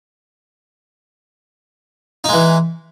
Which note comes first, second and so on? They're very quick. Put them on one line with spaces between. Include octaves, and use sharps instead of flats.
D#4 G#3 E3